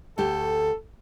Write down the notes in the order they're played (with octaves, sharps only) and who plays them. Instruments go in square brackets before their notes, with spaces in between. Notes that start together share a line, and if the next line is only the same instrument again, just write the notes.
[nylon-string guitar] D2 A3 G4 [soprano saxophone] A4